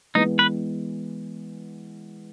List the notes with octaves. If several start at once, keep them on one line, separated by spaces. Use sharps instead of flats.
E3 G#3 B3 D#4
B4